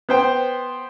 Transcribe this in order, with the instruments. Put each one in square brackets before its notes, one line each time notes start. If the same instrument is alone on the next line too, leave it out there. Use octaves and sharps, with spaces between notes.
[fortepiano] B3 C5 G5